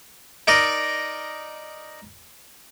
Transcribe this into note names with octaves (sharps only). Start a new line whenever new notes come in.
D#4 A#4 D5 D#5